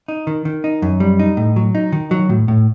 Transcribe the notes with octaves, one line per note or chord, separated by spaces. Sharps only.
D#4
D#3
D#3
D#4
F#2
G3
D#4
A2
F#3
D#4
D#3
F#3
A2
A2